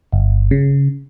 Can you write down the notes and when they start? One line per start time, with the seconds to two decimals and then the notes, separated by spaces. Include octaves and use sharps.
0.12 G1
0.51 C#3